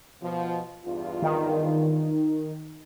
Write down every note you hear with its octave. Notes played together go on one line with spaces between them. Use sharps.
B2 F3
E2 G2 F4
D#3